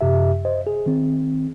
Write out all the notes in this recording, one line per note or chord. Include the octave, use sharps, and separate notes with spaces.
F#2 C3 G4 E5
C5 D#5
G#4
D#3 C4